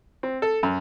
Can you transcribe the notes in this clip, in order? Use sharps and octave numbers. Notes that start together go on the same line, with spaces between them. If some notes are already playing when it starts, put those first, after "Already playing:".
C4
A4
F#2